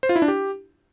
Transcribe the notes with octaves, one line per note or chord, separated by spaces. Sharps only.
C5
F4
E4
D4
G4